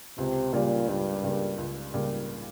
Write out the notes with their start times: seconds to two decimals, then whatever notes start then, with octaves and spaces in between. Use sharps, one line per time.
0.18 C#2 C3
0.53 A#2 C#3 G3 A#3
0.89 C#2 G2
1.23 C#3 G3 A#3
1.58 C#2
1.94 C#3 G3 A#3